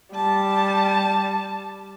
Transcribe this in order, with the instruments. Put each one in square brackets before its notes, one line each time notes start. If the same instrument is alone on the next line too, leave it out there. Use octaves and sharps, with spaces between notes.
[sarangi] G3 [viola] A5